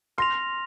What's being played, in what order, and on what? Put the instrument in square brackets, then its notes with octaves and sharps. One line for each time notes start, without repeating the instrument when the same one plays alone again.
[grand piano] C6 [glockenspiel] F6 A#6 F7